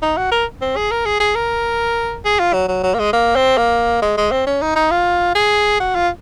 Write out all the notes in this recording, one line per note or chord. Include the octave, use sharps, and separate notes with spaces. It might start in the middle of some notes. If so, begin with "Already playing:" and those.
D#4
F#4
A#4
C4
G#4
A#4
G#4
G#4
A#4
G#4
F4
F#3
F#3
F#3
A#3
G#3
A#3
C4
A#3
G#3
G#3
C4
C#4
D#4
D#4
F4
G#4
F#4
F4